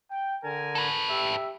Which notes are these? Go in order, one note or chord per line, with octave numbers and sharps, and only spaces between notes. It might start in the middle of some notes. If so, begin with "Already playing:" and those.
G5
D3 A#4 G#5
A4 B4
G4 E5